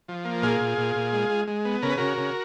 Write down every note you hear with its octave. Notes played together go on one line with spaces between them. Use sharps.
F3
A#3
A#2 F4 G#4
A#2
A#2
A#2
G#3
G#3
G#3
B3
C#3 A#4
B4
C#3 F#4 A#4
C#3